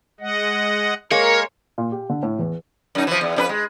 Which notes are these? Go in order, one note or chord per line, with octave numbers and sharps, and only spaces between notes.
G#3 D#5 F#5
G#3 A#3 A#4 C#5
A#2
G4
D3
A2
E2
F#2 D#4
E3 F3
E2
F2 D4 B4
G#3